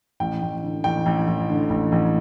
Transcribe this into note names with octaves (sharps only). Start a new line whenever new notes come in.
A1 G5
A1
D3
A1 G5
A1
A1
D3
A1
A1